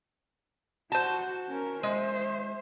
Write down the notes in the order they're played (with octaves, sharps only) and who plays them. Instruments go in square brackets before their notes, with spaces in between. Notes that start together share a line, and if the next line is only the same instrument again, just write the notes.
[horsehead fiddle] F#4 [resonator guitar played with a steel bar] C5 A5
[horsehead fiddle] C#4 A#4
[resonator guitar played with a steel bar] G#3 [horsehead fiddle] C5 E5